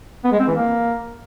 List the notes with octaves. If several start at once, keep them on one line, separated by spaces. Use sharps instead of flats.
B3
G#3
C4
E3
A#3